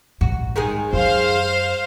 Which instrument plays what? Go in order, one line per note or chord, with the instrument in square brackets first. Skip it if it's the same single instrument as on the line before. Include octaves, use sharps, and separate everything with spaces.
[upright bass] A#1 G#2 [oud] F#4
[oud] D#3 G#3 G#4
[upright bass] F#2 [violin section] C5 F5